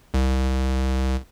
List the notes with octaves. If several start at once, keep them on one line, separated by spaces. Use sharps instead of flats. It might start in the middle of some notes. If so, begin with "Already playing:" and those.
C2